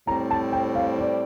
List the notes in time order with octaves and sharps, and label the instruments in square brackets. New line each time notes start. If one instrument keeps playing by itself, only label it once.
[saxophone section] A2 G3 C4 [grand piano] A#5
[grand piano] A5
G5
F5
D5